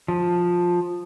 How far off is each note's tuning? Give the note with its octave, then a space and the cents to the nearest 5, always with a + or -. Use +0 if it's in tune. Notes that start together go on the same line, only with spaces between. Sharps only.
F3 +10